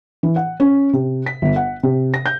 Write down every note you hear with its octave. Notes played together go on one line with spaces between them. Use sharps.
E3
F#5
C#4
C3
B6
G1
F#5
C3
A#6
G6